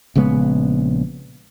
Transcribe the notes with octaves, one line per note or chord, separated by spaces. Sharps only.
A#1 C#3 G#3 B3